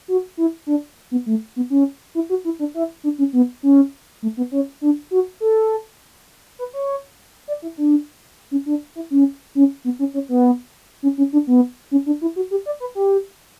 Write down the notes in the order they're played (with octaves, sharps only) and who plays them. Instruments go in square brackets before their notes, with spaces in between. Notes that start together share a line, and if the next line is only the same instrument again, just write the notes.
[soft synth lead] F#4
E4
D4
B3
A3
B3
C#4
E4
F#4
E4
D4
E4
D4
C#4
B3
C#4
A3
B3
C#4
D4
F#4
A4
B4
C#5
D5
E4
D4
C#4
D4
E4
C#4
C#4
B3
C#4
C#4
B3
C#4
C#4
D4
B3
C#4
D4
E4
F#4
G4
D5
B4
G4